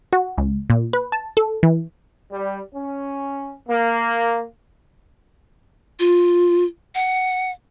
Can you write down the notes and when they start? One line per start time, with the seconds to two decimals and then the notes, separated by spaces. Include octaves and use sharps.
0.13 F#4
0.38 C#2
0.70 A#2
0.93 B4
1.12 A5
1.37 A4
1.63 E3
2.32 G3
2.73 C#4
3.68 A#3
5.99 F4
6.95 F#5